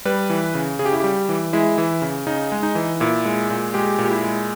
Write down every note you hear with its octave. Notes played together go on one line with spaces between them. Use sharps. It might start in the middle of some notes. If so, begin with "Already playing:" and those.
G3 B4
E3
C#3
C#3 G#4
G4
E4
G3 G4
E3
G#3 E4
E3
C#3
C#3 D#4
G#3
D#4
E3
A#2 E4
G#3
A#2
G#3 G4
A#2
G4
E4
G#3